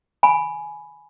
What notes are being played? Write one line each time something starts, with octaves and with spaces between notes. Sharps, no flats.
G#5 B5